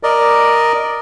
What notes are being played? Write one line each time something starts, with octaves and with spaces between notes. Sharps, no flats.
A#4 D5 D#5